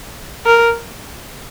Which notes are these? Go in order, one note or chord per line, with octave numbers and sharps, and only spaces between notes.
A#4